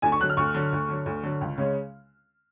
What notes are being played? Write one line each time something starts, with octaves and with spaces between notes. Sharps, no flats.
D2 G#5
C#6
D3 F#3 F#6
F6
D2 C#6
D3 F#3
D2
D3 F#3
D2
D3 F#3
C#2
C#3 G#3 C#4